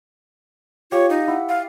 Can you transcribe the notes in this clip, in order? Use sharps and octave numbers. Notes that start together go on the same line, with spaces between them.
F4 G4 C#5 F5
D#4
E4 F#5
F5